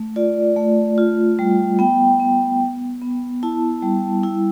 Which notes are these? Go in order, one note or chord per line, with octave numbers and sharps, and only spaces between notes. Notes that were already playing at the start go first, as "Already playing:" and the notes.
Already playing: A3
F4 D5
A3
F4
G3
B3 G5
B3
B3
B3
E4 A5
G3
E4